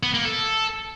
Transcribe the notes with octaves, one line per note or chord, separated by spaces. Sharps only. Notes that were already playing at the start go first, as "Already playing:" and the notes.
B3
A#3
A4